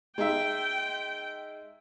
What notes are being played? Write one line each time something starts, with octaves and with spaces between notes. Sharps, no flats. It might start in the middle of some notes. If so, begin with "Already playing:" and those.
G#3 D#4 E5 G5